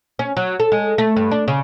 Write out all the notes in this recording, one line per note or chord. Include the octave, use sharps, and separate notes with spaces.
C#4
F#3
A4
G#3
A3
G2
D4
C#3